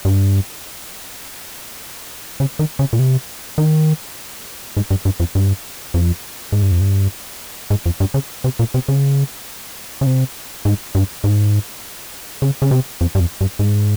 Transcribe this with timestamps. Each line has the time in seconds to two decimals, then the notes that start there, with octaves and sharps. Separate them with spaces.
0.05 G2
2.40 C#3
2.59 D#3
2.79 C#3
2.93 A#2
2.99 C3
3.58 D#3
4.77 G#2
4.91 G2
5.05 G2
5.20 F2
5.35 G2
5.94 F2
6.52 G#2
6.62 G2
6.71 F2
6.81 G2
7.70 G#2
7.86 F2
8.00 G2
8.14 C#3
8.44 C3
8.59 A#2
8.74 C3
8.88 C#3
10.01 C#3
10.06 C3
10.65 G#2
10.95 G2
11.24 G#2
12.42 C#3
12.62 C#3
12.71 C3
13.01 F2
13.15 G2
13.20 F2
13.41 G2
13.59 G#2